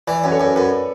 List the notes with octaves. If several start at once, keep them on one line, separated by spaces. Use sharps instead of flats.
E3 B4 D5
F#2 B4
A4 C#5
F#2
F#2 B4 D5